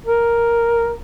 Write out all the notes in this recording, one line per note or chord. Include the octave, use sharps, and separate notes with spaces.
A#4